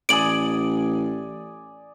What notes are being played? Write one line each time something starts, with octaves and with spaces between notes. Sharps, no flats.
A1 D5 G#5 D#6 D7 F#7